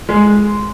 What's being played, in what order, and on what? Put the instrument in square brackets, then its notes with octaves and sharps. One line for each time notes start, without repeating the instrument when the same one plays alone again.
[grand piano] G#3